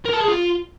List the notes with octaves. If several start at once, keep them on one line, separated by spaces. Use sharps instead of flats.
A#4
A5
G#4
F4